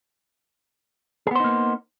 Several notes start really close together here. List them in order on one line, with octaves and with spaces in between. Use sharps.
G#4 B3 C5 D#4 A#3